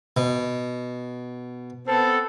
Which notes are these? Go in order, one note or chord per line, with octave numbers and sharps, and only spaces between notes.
B2
B3 C4 A4